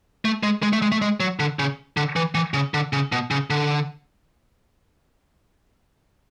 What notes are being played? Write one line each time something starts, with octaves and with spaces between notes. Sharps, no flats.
A3
G#3
G#3
A3
G#3
A3
G#3
F#3
D3
C#3
D3
E3
E3
C#3
D3
C#3
B2
C#3
D3